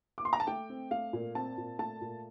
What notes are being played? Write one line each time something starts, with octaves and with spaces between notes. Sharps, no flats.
D6
C6
A#5
A5
A3 G5
C4
A3 F5
A#2
C4 A5
A#2
A3 A5
A#2